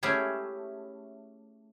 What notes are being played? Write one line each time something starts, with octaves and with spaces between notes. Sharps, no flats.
A3 C#4 E4 G4 G#4